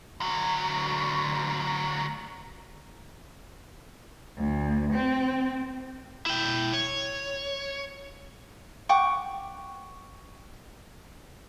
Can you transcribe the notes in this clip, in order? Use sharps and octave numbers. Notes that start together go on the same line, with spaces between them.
D2 F#3
D2
C4
E4 G5
C#5
F#5 G5 C#6 D6